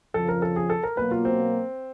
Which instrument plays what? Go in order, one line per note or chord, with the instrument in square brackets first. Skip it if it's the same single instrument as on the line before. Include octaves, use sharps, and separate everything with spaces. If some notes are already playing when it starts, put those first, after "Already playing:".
[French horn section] F2 C#3 F3 [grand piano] A4
[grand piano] A#4
A4
G#4
A4
A#4
[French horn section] B2 F#3 A#3 [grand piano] B4
[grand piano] F4
C4